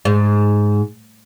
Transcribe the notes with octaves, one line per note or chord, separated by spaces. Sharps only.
G#2